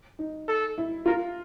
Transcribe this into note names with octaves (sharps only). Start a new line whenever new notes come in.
D#4
A4
E4
F4 A#4